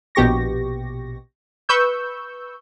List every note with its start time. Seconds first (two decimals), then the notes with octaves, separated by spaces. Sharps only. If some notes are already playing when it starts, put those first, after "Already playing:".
0.15 A#1 B2 G4 C#6 A#6
1.69 B4 C#6 E6 G6